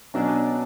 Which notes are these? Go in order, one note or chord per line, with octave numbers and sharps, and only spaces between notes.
B2 F#3 C#4 D4